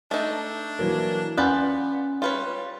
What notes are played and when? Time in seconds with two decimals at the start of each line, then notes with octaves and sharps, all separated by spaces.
0.11 A3 D4 D#4
0.79 E3 F#3 A#3
1.37 B3 C#4 F4 B4 D5 F#5 G#5 F#6
2.22 G3 F4 B4 C#5